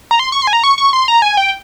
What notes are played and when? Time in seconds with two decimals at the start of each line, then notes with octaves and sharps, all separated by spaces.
0.11 A#5
0.19 C6
0.32 C#6
0.42 C6
0.47 G#5
0.53 A#5
0.64 C#6
0.78 C#6
0.93 C6
1.08 A#5
1.22 G#5
1.37 G5